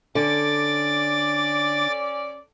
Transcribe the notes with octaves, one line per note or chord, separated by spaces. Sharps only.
D3 C#4 D5 D6 A6